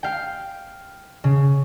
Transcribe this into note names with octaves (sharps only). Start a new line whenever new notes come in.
F5 G5
C#3